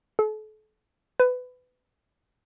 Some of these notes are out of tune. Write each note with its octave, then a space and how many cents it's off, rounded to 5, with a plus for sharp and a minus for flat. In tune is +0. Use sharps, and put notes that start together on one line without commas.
A4 -40
B4 +20